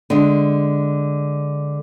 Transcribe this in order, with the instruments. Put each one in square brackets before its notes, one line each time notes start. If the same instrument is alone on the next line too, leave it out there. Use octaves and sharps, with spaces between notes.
[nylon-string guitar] D3 G#3